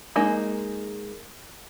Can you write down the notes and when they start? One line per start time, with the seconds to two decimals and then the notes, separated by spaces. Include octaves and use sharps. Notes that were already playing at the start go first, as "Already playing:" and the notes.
0.16 G#3 A#3 D#4